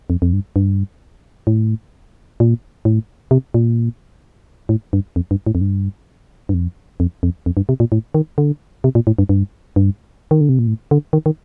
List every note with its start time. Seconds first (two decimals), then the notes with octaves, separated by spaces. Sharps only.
0.10 F2
0.22 F2
0.33 G2
0.56 G2
1.47 A2
2.40 A#2
2.85 A2
3.31 C3
3.54 A#2
4.69 A2
4.93 G2
5.16 F2
5.31 G2
5.47 A2
5.55 F2
5.61 G2
6.49 G2
6.54 F2
7.00 F2
7.23 F2
7.46 F2
7.57 G2
7.69 C3
7.80 A#2
7.92 A2
8.15 D#3
8.38 D3
8.84 C3
8.95 A#2
9.07 A2
9.19 G2
9.29 G2
9.76 G2
10.31 D#3
10.41 D3
10.49 C3
10.59 A#2
10.67 A2
10.91 D3
11.13 D#3
11.26 D#3